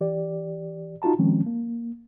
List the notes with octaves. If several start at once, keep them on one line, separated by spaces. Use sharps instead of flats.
E3 G4 D5
D#4 F4 F#4 A5 A#5
D#3 F3 G#3 C4 C#4
A#3